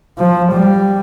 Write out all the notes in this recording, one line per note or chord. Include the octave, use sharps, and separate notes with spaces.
F3
G3